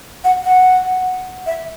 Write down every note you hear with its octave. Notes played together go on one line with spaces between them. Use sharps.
F#5
F#5
E5